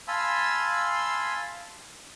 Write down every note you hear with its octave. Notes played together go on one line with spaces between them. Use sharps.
F5 G#5 A5 B5 C6 E6